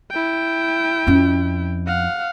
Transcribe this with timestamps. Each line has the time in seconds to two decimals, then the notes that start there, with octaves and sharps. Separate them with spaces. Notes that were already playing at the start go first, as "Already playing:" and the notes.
0.11 E4 G5
1.07 F2 C#4
1.87 F5 F#5